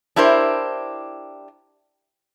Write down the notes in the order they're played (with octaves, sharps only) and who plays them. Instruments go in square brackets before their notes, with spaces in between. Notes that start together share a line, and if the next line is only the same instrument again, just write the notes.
[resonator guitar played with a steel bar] D4 E4 G4 A#4 C5